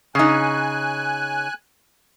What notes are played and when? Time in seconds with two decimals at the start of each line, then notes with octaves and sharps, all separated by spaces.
0.15 C#3 D#4 G#5 F#6